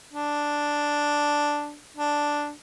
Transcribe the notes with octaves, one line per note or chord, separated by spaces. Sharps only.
D4
D4